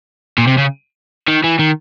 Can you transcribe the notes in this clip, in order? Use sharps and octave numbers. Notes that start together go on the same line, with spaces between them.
A#2
C3
C#3
D#3
E3
D#3